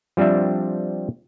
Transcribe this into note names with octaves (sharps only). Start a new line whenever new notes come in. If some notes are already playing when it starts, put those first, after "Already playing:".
F3 G3 C4 D4 E5